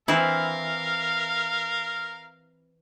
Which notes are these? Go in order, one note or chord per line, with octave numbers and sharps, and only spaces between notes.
E3 C4 E4 A#4 F5